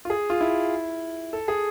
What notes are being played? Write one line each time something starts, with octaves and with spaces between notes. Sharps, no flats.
F4
G#4
F4
E4
A4
G#4